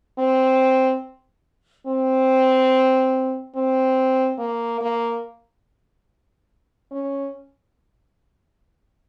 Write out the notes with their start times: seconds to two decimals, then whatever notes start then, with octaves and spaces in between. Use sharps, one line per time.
0.19 C4
1.87 C4
3.56 C4
4.39 A#3
4.81 A#3
6.92 C#4